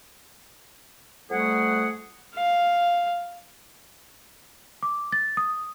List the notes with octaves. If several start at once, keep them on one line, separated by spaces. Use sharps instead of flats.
F2 G3 A3 G#4 F#5
F5
D6
A6
D#6